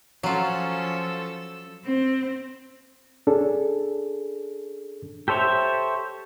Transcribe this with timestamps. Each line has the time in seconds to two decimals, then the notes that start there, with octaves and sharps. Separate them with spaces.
0.23 F3 F#3 C#4 F4 A4 E6
1.86 C4
3.27 C#4 D4 G#4 A4
5.28 G4 A4 C5 C#5 E5